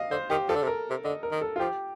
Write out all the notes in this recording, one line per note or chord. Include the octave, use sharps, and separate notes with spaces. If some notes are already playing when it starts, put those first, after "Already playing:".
Already playing: D#5 F5
D3 C5
D#3 G4
F3 A4
D3
C3
A#4
C3
D3 D#5
A#4
D#3
A4
F4
F3 G4